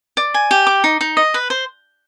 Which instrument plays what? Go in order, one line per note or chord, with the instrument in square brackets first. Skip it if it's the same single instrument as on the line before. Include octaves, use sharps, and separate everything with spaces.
[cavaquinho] D5
G#5
G4
D6
D#4
D#4
D#5
B4
C5